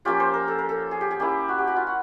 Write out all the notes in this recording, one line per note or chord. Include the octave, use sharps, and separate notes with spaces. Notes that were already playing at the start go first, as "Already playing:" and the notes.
F3 A#3 C#4 F4 G4
C5
A#4
A4
A#4
A4
G#4
G4
G#4
A#3 C#4 E4 G4
F#4
G4
F#4
F4
F#4